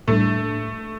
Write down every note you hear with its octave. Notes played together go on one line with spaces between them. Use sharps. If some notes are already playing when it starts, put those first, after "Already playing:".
A2 G3 A3 D4